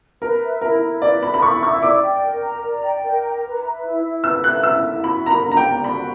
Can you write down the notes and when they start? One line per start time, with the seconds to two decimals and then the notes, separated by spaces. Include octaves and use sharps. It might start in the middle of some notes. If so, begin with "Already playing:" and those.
0.22 A#4 B4
0.42 E5
0.61 E4 A#4
0.83 E4
1.02 B4 D5
1.23 E5 B5
1.34 B5
1.43 E4 C#6
1.62 E4 C#6
1.82 D5 D6
2.03 G5
2.23 A#4
2.42 A#5
2.63 D5
2.83 G5
3.03 A#4
3.23 A#5
3.43 B4
3.63 E5
3.83 E4
4.03 E4
4.23 B4 E6
4.44 E5 F#6
4.63 E4 E6
4.84 E4
5.03 F#4 B5
5.24 A#4 A#5
5.31 B5
5.44 D4
5.51 A#5
5.57 G5
5.64 D5
5.84 F#4 B5